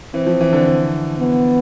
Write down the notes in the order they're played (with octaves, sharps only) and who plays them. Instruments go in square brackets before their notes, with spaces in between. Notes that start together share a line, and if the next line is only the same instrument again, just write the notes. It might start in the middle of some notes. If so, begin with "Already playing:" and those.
[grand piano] E3 [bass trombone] C4
[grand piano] F3
E3
D3
D3
[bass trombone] B3